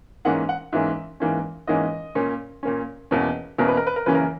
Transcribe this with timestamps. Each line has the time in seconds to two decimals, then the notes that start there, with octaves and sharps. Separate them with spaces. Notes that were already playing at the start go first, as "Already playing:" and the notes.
0.25 G#2 E3 A#3 C#4 F#5
0.49 F#5
0.72 G#2 E3 A#3 C#4 E5
1.20 G#2 E3 A#3 C#4
1.67 G#2 E3 A#3 C#4 D#5
2.15 A#2 A#3 C#4
2.63 A#2 A#3 C#4
3.11 E2 B2 A#3 C#4
3.58 E2 B2 A#3 C#4 A#4
3.68 B4
3.77 A#4
3.87 B4
3.96 A#4
4.06 F#2 C#3 E3 A#3 C#4 B4
4.15 A#4